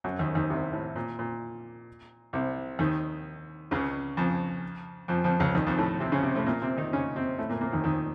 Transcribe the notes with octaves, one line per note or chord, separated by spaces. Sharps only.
F#2 F#3
D#2 D#3
D#2 D#3
C2 C3
A2
A#2
A#2
C2 C3
D#2 D#3
C#2 C#3
F2 F3
F2 F3
F2 F3
C#2 C#3
D#2 D#3
F2 F3
A2 A3
C3 C4
C#3 C#4
C3 C4
A2 A3
A#2 A#3
C3 C4
D#3 D#4
C#3 C#4
C3 C4
A2 A3
A#2 A#3
A#2 A#3
D#2 D#3
D#2 D#3